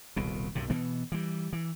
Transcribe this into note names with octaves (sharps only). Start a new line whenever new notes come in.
D#1 C2 B2
B1 F#2 A2 C3
B2 E3 B3
E3 G3
E3